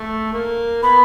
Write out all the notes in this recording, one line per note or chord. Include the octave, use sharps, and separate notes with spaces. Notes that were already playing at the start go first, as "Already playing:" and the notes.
Already playing: A3
A#3
B3 B5